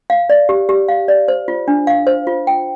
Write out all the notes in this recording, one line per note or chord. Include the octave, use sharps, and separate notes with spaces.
F5
D5
G4
G4
F5
D5
C5
F4
D4
F5
C5
F4
G5